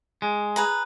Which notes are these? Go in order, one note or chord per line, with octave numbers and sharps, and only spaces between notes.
G#3
G#4 B4 A#5